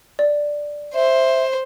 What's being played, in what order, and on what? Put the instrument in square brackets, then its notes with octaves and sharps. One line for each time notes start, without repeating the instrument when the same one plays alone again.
[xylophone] D5
[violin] C5 [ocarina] E5